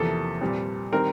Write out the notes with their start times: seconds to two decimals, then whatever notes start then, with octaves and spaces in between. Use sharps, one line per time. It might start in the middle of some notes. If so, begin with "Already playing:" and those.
Already playing: E2 C3 F3 A#3 A4
0.41 A#2 G3 C4
0.92 D#3 G3 C4 A#4